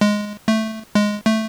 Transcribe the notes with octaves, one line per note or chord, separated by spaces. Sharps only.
G#3
A3
G#3
A3